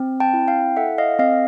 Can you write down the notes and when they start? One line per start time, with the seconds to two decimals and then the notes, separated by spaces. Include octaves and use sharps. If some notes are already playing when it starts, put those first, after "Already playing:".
Already playing: C4
0.20 G5 A5
0.34 E4
0.48 F5 G5
0.77 A4 E5 F#5
0.98 D#5 F5
1.19 C4 D#5 F5